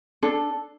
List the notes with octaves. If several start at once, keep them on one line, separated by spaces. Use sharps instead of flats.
D4 A4